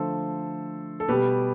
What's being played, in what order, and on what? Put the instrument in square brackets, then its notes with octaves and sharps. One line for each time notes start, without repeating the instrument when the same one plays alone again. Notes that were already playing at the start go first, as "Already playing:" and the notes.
Already playing: [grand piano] D3 F3 A3 A4 C5
A4
B2 G3 G4 B4